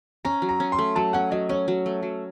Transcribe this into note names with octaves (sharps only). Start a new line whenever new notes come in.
C#4 A#5
F#3
A#5
C#4
C6
A3
F#3 A5
C#4 F#5
F#3 D#5
C#4 C#5
F#3
A3
F#3